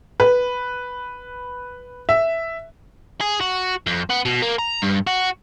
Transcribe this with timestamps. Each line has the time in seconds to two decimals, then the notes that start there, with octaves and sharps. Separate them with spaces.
0.20 B4
2.09 E5
3.21 G#4
3.41 F#4
3.87 F2
4.10 B3
4.25 B2
4.42 A#3
4.59 A#5
4.82 G2
5.07 F#4